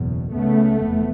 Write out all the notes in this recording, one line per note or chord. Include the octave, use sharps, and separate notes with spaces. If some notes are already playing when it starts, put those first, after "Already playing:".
Already playing: F#1 E2 B2
C#2 C#3 A3 B3
F1 E2